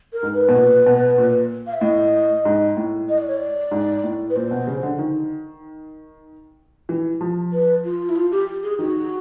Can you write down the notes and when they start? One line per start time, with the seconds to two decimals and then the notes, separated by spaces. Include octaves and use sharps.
0.13 A#4
0.23 G#2
0.34 B4
0.48 B2
0.55 A#2
0.86 B2
1.18 A#2
1.67 F5
1.73 E5
1.81 A2 D#5
2.45 G#2
2.77 A2
3.09 D#5
3.18 D5
3.28 C#5
3.36 D5
3.71 G#2
4.04 A2
4.30 B4
4.36 A#2 C5
4.51 B2
4.67 C#3
4.83 D3
4.99 D#3
6.89 E3
7.21 F3
7.52 B4
7.84 F4
8.09 E4
8.16 F4
8.31 G4
8.63 G#4
8.79 D#3 F#4